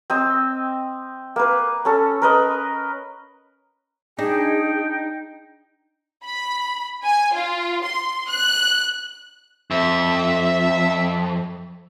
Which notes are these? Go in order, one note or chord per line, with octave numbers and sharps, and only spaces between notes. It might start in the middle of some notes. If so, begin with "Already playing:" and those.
C4 D#5 E6
A#3 B4
C#4 A4
A#4 B4 D#5
D4 D#4 G#4 G5
B5
G#5
F4
C6
F#6
F2 E5